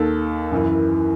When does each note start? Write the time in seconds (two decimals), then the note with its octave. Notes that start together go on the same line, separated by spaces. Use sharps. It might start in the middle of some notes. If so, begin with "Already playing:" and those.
Already playing: D#2 D#3 A4
0.52 F#2 E3